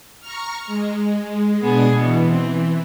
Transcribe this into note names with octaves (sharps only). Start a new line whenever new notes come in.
A#5 C#6 F6
G#3
B2 B3 D4 G#4
B2 E3
C4